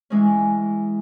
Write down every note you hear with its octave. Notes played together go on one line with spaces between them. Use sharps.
E3 G#3 C#4